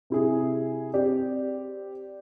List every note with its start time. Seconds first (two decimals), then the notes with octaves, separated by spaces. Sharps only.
0.10 C3 E4 G#4
0.94 C4 G4 D5